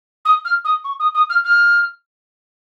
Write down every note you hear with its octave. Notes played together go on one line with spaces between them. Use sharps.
D#6
F6
D#6
C#6
D#6
D#6
F6
F6